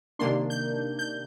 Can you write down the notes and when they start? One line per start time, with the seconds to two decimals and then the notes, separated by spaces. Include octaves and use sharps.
0.19 C3 D#3 A#3 D4 C6
0.50 G6
0.99 G6